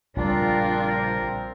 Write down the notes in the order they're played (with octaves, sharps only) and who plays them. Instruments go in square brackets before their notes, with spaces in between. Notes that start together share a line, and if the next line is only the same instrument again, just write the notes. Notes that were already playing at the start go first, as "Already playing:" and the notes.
[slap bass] A#1 C#3 G3 [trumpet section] C4 A#4 [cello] D4 F4